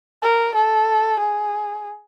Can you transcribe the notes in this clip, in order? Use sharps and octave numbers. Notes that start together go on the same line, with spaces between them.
A#4
A4
G#4